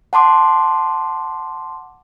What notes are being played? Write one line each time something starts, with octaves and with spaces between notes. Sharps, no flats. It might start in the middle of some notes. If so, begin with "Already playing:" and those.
F#5 A5 C6 D6